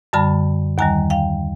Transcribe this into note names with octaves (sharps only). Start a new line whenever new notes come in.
F#2 D3 G3 A5 B5
D#2 D#3 G3 G#5 A#5
F5 G5